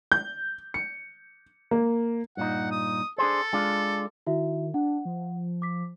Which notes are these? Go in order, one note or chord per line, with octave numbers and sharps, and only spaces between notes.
G6
C#7
A#3
G2 A#2 D#4 F#5
D#6
D4 G#4 A4 C5
G#3 D4 F4
D#3 E4 F#4 E5
D4 F#5
F3
D6 B6